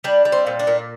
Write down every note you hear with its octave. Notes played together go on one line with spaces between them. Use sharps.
G3 D4
G3
C4
A#2
D4
A#2